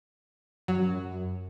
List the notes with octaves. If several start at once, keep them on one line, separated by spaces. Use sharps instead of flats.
F#2 F#3